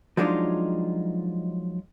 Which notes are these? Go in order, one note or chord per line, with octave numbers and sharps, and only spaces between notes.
F3 F#3 G#3 D4 D#4 F4